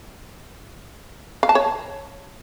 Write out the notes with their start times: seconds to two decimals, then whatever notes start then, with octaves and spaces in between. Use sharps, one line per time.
1.43 F5
1.49 A5
1.55 C#5